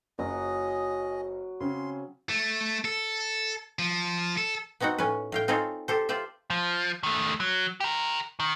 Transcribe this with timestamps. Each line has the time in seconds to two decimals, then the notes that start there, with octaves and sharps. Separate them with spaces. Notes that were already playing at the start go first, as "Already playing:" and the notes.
0.19 F#1 F#3 G#4 D#5
1.60 C#3 C4 C#4 C6
2.29 A3
2.85 A4
3.79 F3
4.38 A4
4.80 B3 C4 D#4 F#4 F#5
4.98 A2 C#4 B4
5.32 A2 F5 G5
5.48 C4 D#4 F4 G#4 A4 C#5
5.88 G4 A4 C5
6.09 F4 G4 C5 D5 E5
6.50 F3
7.03 D#3 A3
7.40 F#3
7.80 G4 A#4
8.40 D#3